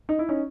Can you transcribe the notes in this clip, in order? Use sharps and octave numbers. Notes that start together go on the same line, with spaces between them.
D#4
E4
C#4 D#4